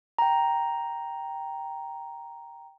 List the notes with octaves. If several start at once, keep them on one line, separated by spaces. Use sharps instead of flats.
G5 A#5